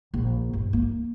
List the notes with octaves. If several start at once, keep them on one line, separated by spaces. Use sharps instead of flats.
A#1
G2
A#3